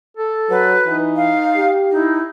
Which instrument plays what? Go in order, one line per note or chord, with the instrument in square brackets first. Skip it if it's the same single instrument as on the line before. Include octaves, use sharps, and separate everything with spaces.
[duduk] A4
[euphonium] F#3 [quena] B4
[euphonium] E3 [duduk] D#4
[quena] F5
[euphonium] G4
[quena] D#4 [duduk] E4